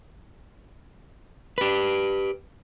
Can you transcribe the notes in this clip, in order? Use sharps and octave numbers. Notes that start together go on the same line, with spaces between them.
G4 B4